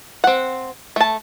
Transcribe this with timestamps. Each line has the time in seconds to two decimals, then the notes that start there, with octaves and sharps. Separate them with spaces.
0.24 C4 F#5
0.96 A3 A5